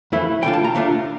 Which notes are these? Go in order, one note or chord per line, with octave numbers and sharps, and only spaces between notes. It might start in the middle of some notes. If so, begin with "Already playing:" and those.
F2 E3 A3 E4
D3 A3 D4 F4 G5
A5
A#5
D3 A3 D4 F4